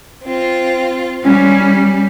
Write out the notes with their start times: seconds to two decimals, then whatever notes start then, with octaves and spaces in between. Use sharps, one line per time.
0.24 C4 F4
1.24 G3 C#4